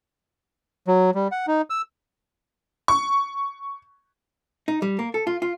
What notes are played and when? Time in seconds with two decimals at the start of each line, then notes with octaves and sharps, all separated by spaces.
0.88 F#3
1.15 G3
1.32 F#5
1.47 D#4
1.70 E6
2.88 C#6
4.68 D#4
4.82 G3
4.99 A#3
5.14 A4
5.27 F4
5.42 F4